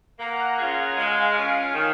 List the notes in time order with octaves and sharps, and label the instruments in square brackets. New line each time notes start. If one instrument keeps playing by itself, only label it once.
[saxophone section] A#3 [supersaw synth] F#5 A#5
[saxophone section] C#4 F4 G#4
[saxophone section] G#3 [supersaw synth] F5 G#5
[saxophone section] C#4 F4 A#4
D#3